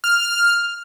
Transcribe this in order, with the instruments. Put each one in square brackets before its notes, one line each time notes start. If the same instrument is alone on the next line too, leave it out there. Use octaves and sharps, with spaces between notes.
[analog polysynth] F6